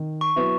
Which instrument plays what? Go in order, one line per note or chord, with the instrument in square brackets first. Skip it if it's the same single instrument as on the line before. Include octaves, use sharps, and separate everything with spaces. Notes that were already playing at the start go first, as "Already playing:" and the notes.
Already playing: [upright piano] D#3
[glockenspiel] C#6
[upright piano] F#3 B3 E4